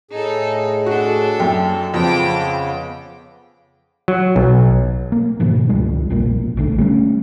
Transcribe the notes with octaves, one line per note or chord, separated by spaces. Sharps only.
A2 D#4 G#4 A4
D4 F#4 A4
F#2 G5
F2 C#3 F3 B3 G5 D6
F#3
B1
A#3
G#2 B2 D#3 F3
C#2 F3 G3 G#3
E1 A#1 A#2 A#3
G#1 D3 A3
G3 A3 B3 C#4